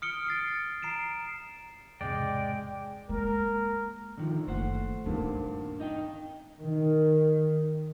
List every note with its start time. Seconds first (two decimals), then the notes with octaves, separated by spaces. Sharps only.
0.02 D#6 F6 C#7 D7 G7
0.27 A6 C7 D7
0.82 A#5 C7 D7 E7
2.01 E2 G#2 C3 G#3 D5 G5
3.09 G#3 A#3 A#4
4.18 D3 D#3 F3
4.47 F#1 A3 C5 F#5
5.06 G2 A#2 D#3 C4 C#4
5.80 D#4 D#5 G5
6.60 D#3